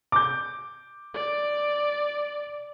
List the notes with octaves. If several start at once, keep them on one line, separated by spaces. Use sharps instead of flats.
D6 G6
D5